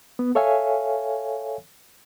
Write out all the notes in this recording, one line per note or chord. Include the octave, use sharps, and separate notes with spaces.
B3
A4 C#5 E5 F5 G#5